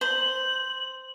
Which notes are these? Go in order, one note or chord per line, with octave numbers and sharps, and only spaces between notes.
C5 F#7